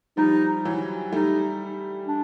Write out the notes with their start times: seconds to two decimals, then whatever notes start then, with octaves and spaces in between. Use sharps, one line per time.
0.17 F3 G3 D#4
0.65 E3 F#3
1.12 G3 A3 D#4
2.07 D4